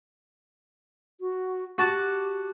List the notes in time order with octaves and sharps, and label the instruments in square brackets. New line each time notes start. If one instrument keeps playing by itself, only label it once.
[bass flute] F#4
[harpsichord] F#4 A5 D6 [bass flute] G4